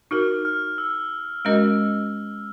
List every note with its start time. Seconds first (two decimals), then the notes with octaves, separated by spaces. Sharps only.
0.11 D#4 F#4 A#4 F6
0.45 F6
0.78 E6
1.45 G#3 C#4 F#4 A#4 D#5